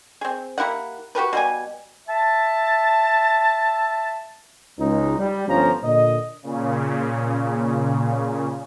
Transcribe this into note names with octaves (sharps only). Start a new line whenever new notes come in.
C4 G#4
A#3 E4 G4 F#5
F#4 G4 A#4 B4
B2 G3 G#5
E5 A5
C#2 D#4
G3
G1 F3 C#4 A#5
A#2 D3 D#5
A#2 C#3